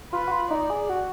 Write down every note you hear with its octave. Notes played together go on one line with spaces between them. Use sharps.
F4 B4
F#4
F4
D#4 D5
G#4
F#4